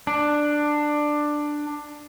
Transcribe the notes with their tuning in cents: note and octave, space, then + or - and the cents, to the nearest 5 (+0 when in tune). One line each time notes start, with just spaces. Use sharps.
D4 +10